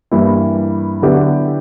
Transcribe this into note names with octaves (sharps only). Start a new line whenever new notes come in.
G2 E3 A#3 E4
D3 F#3 B3 E4 G4